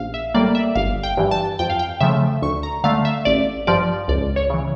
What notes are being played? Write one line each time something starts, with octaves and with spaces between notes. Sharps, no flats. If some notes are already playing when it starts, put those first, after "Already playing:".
Already playing: A#1 F5
E5
A2 G3 A#3 D5
E5
G1 F5
G5
G2 E3
A5
F2 G5
F5
G5
C#3 F3 A3 E5
D2 C#6
A#5
D3 A3 F5
E5
A1 D5
G2 F3 D5
C#2 D5
C#5
C#3 E3